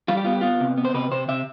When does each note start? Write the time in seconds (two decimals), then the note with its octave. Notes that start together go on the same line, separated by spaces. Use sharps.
0.08 G3 F4
0.17 G4
0.24 B3 F4
0.33 G4
0.41 B3 F4
0.60 C3
0.78 B3
0.85 C5
0.94 C3 B4
1.11 C3 C5
1.28 C3 E5